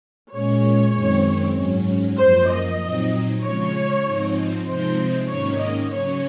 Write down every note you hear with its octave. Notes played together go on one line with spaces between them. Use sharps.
A#2 G#3 C#4 C#5
F#2 D#3 G#3 C4
G#2 F#3 C#4
F#2 F3 A#3 C5
D#5
A#2 F#3 C4 D#4
C#3 F3 G#3 C#5
G#2 F3 C4 D#4
C3 F3 G#3 C4 D#4 C5
G#2 D#3 A#3 C#4 C#5
D#5
C#3 F#3 C#4 C#5